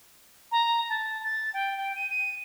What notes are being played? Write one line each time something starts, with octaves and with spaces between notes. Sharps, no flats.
A#5
A5
A6
G5
G5
D#7
D#7